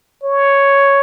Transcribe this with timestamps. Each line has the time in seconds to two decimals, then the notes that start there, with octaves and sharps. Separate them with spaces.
0.23 C#5